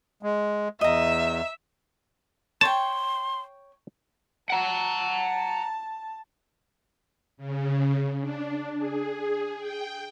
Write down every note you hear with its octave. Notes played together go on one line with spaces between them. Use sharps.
G#3
E2 D#5 E5 A#5
C#5 G5 A5 C6
F#5 A5 A#5
C#3
D4
G#4
G5